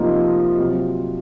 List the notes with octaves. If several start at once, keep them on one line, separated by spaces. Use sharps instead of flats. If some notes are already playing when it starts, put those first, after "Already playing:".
Already playing: C3 F3 A#3 D#4
C3 F#3 C4 F4